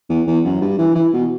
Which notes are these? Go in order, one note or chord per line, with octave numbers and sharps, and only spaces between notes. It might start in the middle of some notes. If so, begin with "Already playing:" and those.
E2
E2
F#2
G2
E3
E3
B2